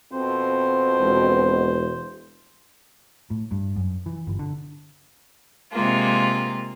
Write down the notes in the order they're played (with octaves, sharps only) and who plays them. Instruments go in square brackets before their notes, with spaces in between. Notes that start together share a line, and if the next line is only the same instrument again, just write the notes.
[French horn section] F2 B2 C4 [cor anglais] C5
[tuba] E1
[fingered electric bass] A2
G2
F#2
E3
G1
D3
[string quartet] C3 G#3 A#3 F4